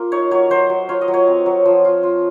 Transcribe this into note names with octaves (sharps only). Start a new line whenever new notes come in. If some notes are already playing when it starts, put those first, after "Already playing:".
Already playing: A#3 F4
D#4 C#5
F#3 C#5
F#3 C5
F#3
F4 C#5
D#5
F#3
C#5
C4
F#3
F3
F4
F4